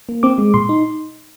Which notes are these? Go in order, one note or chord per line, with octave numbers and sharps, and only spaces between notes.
A#3
C4 D6
G#3
A#2 C6
D#4